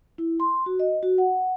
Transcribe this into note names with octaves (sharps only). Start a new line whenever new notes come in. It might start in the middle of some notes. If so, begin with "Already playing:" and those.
E4
C6
F#4
D#5
F#4
F#5